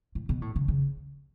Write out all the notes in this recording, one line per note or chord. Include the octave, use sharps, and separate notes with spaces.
A2
B2
A2
C#3
C#3